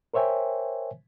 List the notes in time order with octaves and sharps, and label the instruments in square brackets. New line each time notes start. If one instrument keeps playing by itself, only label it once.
[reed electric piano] A#4 C5 C#5 E5 G5 G#5